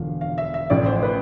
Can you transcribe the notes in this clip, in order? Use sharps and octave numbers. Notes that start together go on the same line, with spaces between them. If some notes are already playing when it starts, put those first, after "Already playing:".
Already playing: E1 E2 D3 F3 F5
F5
E5
E5
A1 A2 F3 D5
C5
B4